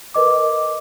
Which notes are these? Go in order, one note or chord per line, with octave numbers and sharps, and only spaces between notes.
A#4 B4 D#5 D6